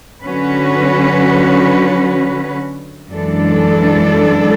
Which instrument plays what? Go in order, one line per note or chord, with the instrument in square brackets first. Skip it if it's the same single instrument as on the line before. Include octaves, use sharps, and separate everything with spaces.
[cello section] D3 F#3 C#4 F#4 B4
F#2 E3 G#3 D4 A4